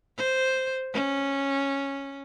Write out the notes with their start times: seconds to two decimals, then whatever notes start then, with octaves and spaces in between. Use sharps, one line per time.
0.18 C5
0.93 C#4